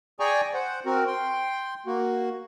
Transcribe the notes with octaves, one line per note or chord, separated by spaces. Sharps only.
G#4 D5 G5 G#5 A#5 C#6
C5 F#5
C4 F#4 A#4
G5 C6
A#3 F#4